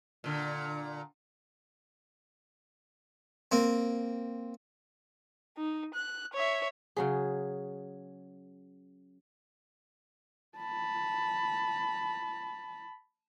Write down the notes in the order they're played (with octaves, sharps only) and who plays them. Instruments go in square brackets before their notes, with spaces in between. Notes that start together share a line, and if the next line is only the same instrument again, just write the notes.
[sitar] A#2 D3
[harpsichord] A#3 C4
[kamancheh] D#4
F#6
C#5 E5
[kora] C#3 F#3 G#4
[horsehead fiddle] A5 B5